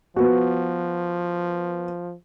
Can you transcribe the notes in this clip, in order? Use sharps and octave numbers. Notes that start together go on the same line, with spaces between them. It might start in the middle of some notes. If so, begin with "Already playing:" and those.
F3 B3 F#4